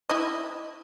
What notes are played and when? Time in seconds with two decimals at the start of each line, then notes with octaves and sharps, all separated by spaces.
0.09 E4 D#5